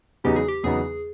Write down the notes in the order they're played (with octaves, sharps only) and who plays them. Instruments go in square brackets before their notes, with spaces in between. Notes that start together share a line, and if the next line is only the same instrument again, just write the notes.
[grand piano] E2 C#3 F#3 B3 D#4 [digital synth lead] G4
[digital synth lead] G#4
G4
[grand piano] E2 C#3 F#3 B3 D#4 [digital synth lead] G#4